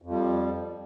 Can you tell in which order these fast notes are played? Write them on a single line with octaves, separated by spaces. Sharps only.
F2 F3 G3